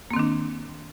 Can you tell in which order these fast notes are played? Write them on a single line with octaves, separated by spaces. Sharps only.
A#3 C4 D#3 D4